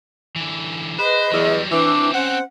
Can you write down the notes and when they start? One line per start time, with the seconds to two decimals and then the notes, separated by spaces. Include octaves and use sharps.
0.36 D3 E3
0.99 G#4 B4 C5 D#5
1.32 E2 F#3 G3
1.71 E3 C4 D4 C#5 D6
2.14 C#4 C5 F#5